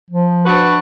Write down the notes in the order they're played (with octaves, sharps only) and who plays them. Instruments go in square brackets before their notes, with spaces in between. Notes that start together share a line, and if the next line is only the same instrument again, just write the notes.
[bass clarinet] F3
[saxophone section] D4 F#4 B4